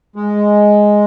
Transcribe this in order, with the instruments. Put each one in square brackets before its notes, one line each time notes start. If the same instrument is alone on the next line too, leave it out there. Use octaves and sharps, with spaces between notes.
[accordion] G#3